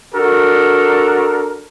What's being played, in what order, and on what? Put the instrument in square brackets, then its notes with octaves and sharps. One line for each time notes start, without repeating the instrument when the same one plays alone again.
[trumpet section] D4 F#4 A4 A#4